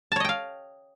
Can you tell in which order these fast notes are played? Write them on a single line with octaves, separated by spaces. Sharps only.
A5 C#5 D#5 G5 F5